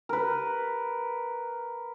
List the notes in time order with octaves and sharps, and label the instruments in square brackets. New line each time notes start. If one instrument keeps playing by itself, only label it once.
[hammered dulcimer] A#4 B4